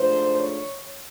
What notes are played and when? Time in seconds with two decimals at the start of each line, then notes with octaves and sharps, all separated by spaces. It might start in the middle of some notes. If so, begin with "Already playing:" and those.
Already playing: G#2 F3 A3 D4 C5
0.38 C#5